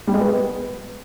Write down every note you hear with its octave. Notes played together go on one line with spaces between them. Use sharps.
G3
G#3
B3